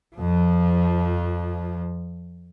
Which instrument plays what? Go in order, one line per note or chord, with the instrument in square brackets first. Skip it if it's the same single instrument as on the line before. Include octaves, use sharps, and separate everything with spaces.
[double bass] F2 F3